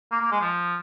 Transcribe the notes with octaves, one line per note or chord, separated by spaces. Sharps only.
A#3
A#3
G#3
F3